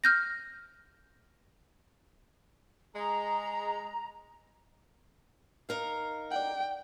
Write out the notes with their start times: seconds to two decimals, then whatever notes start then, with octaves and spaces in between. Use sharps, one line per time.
0.04 F6 G6 A#6
2.95 G#3 A#5
5.69 D#4 A#4 F5
6.31 D5 F#5 G5